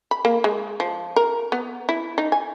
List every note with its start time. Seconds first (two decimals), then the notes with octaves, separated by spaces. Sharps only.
0.11 B5
0.25 A#3
0.44 G#3
0.80 F3
1.16 A#4
1.52 B3
1.89 E4
2.18 D#4
2.32 G#5